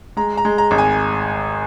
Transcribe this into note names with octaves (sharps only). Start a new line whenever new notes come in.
G#3 A#5
A#5
G#3
A#5
G#1
G#5